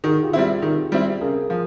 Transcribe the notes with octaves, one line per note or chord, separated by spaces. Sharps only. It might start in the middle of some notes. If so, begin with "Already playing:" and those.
D#3 F#4 G#4
F4 G4
G3 C4 E4
D#3
G3 C4 E4
C#3 G#4 A#4
F3